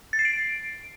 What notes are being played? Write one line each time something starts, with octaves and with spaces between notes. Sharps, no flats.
A6
C7
D7